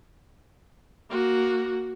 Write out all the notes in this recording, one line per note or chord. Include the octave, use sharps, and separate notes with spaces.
A#3 F#4